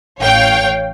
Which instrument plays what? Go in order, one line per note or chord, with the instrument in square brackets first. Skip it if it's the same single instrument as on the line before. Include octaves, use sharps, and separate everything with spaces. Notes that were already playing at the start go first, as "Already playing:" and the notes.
[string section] A1 C#5 F5 G5